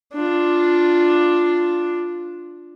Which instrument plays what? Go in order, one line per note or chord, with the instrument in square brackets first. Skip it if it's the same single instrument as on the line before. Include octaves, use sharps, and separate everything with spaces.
[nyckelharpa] D4 F4